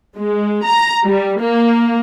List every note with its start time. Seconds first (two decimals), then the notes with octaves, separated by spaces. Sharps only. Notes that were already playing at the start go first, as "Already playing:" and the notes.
0.16 G#3
0.64 A#5
1.04 G3
1.40 A#3